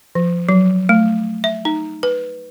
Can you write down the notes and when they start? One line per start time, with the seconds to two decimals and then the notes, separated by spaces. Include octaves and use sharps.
0.15 F3
0.49 F#3
0.89 A3
1.44 E5
1.65 D#4
2.03 B4